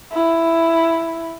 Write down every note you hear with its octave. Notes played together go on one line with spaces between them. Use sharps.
E4